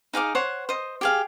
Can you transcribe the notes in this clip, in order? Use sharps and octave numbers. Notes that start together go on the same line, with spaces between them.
D#4 G#4 F5 D6
C5 C#5 F#5
C5 D#5
G4 G#4 F5